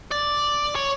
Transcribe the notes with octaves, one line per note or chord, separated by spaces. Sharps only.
D5
C#5